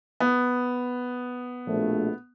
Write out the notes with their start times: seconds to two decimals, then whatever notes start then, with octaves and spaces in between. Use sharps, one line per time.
0.20 B3
1.67 A#1 B2 A3